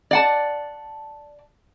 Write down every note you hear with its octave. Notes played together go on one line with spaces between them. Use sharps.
D5 F#5 A5